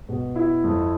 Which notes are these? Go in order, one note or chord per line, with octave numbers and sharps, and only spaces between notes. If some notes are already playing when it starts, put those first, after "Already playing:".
B2
E4
F2